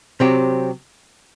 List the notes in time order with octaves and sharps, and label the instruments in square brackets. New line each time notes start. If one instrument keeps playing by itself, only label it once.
[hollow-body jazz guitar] C3 F#3 C4 G4